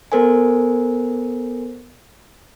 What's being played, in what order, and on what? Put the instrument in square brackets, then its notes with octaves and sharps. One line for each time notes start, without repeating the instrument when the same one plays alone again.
[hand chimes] B3 A4 A#4 C5 G#5